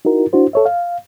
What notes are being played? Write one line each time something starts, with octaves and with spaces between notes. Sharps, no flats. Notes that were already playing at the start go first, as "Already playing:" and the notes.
D#4 E4 F#4 A#4
D4 E4 F#4 C5
A4 C#5 E5
F5